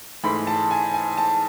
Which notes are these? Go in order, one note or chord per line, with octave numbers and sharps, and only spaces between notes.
G#2 E3 A3 B5
A5
G#5
G#5
A5